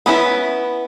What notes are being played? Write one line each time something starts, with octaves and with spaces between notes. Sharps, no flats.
B3 C#4 E4 A4 B4